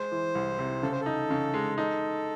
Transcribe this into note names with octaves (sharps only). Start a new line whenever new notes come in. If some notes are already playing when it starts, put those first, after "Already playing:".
Already playing: G#3 C5
E3
C2
C3
C#3 A4
C5
A4
D#4
C#3
G#3
D#4 A4